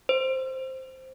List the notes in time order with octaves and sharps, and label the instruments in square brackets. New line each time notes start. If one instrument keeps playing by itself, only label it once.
[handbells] C5